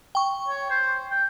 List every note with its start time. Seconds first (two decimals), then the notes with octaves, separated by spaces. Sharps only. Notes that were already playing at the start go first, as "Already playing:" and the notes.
0.15 G5 C#6
0.48 C#5
0.70 C5
1.11 G5